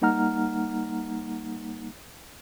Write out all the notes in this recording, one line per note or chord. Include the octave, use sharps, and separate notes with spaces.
G3 A#3 D#4 F#5 A#5 F6